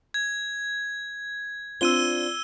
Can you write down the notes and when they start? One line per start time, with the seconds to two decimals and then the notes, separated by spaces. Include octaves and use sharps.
0.14 G#6
1.81 C4 D4 F4 E6 D#7 G7